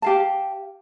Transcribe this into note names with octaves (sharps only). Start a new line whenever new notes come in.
G4 F5 A5